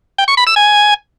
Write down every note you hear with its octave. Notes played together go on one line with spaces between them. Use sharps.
G5
C#6
B5
E6
G#5